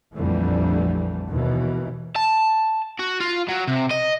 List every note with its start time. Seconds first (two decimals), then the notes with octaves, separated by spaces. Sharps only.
0.15 A#1 F2 D3 E3 G3 A3
1.29 D#2 B2 E3
2.16 A5
2.99 F#4
3.20 F4
3.48 F#3
3.67 C3
3.91 D#5